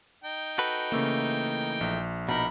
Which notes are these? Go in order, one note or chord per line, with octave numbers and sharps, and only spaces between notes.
D#4 G5
F#4 A4 B4
C#3 E3 A3 A#3
A#1
B2 D#4 A#4 B5